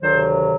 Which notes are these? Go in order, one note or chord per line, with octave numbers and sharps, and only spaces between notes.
D2 C3 D#3 F#3 C5